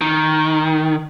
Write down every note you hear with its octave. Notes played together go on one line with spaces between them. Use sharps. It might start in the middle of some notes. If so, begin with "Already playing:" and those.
D#3